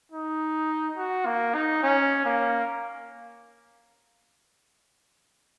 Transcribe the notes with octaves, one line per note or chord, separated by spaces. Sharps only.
D#4
F#4
A#3
D#4
C#4
A#3